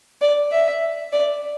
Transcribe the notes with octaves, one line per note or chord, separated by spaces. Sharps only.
D5
E5
D5